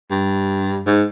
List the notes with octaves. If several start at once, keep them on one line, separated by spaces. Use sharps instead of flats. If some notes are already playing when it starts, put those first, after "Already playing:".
G2
G#2